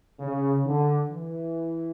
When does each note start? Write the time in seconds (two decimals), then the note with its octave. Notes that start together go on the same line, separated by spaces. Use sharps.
0.20 C#3
0.64 D3
1.09 E3